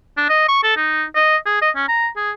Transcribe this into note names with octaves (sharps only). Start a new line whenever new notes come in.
D4
D#5
C#6
A4
D#4
D#5
G#4
D#5
C#4
A#5
G#4